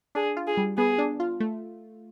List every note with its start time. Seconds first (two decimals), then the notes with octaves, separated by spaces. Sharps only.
0.15 D4 G#4
0.37 F4
0.47 G#4
0.57 G3
0.78 B3 G#4
0.98 D4
1.20 F4
1.40 A3